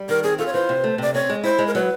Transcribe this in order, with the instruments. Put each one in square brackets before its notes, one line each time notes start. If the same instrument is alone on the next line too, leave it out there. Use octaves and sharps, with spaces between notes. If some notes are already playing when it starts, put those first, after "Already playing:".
Already playing: [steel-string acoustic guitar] G3
[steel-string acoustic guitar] D#3 [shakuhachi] A#4
[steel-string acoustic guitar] C4 [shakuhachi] G#4
[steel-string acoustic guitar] F4 [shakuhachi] A4
[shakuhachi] C#5
[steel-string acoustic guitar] E3 [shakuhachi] C5
[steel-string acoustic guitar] C3
A3
[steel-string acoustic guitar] C3 [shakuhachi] D5
[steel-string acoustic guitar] C4 [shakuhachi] C#5
[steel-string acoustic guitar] G#3
[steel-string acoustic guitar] E4 [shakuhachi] C5
[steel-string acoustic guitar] G#3
[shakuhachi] A#4
[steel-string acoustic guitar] F#3 [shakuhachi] B4